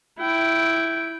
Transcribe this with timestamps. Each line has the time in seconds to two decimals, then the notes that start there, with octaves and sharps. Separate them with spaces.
0.20 E4 G5